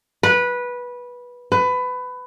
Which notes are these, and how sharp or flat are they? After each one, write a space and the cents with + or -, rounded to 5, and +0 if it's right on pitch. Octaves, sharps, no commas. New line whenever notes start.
B4 -15
B4 +20